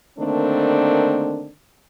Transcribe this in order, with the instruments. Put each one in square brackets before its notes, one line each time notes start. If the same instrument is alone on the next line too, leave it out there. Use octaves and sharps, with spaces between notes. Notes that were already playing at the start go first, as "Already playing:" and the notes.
[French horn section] D3 D#3 A3 A#3 C4 D4